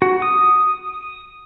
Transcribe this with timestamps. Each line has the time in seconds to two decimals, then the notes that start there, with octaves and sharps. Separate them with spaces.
0.02 F#4
0.22 D#6